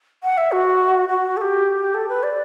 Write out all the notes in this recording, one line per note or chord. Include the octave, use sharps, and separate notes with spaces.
F#5
E5
F#4
F#4
A4
G4
A4
B4
D5